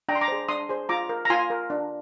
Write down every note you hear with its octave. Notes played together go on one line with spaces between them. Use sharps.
D4 G5 A#5
C6
A#5 D6
G#4 C5
D4 C6 D#6
G#4 C5
F4 A#5 D6
A#4
A#5
F4 G#5 C6
A#4
D4